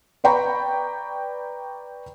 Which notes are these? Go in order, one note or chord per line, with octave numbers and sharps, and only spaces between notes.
B4 D5 G5 A#5 B5 C#6